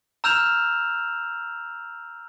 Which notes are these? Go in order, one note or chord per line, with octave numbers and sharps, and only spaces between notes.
A#5 E6 F6 G6 E7 F7